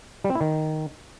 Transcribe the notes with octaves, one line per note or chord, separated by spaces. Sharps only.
G3
C4
E4
D#3